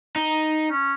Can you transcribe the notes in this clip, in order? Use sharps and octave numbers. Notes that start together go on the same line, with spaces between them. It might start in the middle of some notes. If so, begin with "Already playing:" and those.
D#4
C#4